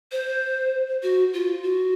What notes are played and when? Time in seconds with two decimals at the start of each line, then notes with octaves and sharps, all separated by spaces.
0.12 C5
1.03 F#4
1.33 F4
1.63 F#4